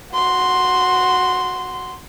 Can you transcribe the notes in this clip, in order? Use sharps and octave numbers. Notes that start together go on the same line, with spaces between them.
F#4 C6